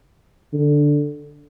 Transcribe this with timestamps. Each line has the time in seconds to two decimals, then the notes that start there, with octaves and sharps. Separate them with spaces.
0.53 D3